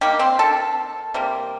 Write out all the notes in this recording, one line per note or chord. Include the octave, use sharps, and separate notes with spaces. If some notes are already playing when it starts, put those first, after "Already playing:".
D#3 G3 A#3 G4
C4 C5
A4 A5
C3 G3 A#3